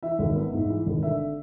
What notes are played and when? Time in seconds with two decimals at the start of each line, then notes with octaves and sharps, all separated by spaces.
0.03 E3 E5
0.19 G#1
0.36 B3
0.53 G#2
0.70 E3
0.86 G#1
1.03 D3 E5